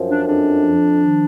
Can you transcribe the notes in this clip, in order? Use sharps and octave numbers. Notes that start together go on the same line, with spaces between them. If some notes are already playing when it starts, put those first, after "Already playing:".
Already playing: F#2 F3
D4
F2 D4
F3
D#3